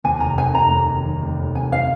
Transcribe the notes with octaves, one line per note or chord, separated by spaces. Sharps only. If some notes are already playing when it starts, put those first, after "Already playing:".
D#2 G#5
F1 A#5
D#3 G#5
F1 A#5
D#2
F1
D#3
F1
D#2
F1 G#5
D#3 F5